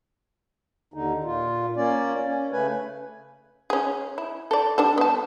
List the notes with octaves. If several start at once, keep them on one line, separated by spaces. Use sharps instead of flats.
D#2 D3 D#4
A#2 F4
A#3 C#4 D5
C#4
C#3 A3 B4 G#5
C#4 G#4
E4
A4 D5
G3 D4 A4
B3 A5